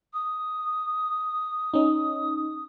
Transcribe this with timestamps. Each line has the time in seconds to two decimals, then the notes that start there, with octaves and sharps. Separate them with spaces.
0.13 D#6
1.74 C#4 D#4